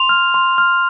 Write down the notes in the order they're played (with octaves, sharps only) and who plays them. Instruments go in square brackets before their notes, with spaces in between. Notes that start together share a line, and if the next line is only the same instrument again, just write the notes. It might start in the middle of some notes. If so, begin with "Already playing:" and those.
Already playing: [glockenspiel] C6 F7
F6
C6
F6